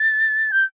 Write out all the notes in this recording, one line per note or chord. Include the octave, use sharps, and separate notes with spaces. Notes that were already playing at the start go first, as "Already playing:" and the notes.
Already playing: A6
G6